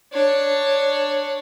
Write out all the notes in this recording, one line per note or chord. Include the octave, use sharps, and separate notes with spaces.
D4 C#5